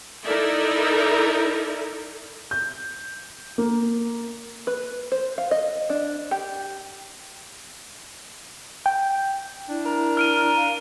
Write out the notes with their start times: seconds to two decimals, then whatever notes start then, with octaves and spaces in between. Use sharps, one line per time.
0.24 D#4 E4 A4 A#4 D5 E5
2.51 G6
3.58 A#3
4.67 B4
5.12 C5
5.38 F5
5.51 D#5
5.90 D4
6.31 G4
8.86 G5
9.69 D4 E4
9.86 A#4
10.17 F6 D7 D#7
10.56 F5